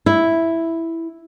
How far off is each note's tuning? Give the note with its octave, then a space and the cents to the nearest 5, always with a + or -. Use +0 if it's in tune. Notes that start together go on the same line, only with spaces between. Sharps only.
E4 +0